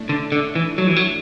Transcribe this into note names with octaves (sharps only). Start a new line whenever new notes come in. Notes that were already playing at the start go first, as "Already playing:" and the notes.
Already playing: A2 A3 D4
D3
D3
E3
F#3
E3
F#3